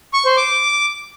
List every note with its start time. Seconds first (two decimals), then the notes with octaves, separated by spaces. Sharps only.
0.13 C#6
0.25 C5
0.37 D6